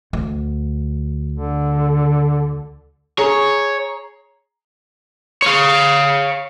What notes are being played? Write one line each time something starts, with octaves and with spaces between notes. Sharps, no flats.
D2
D3
G#4 C#5 A#5
C#5 F5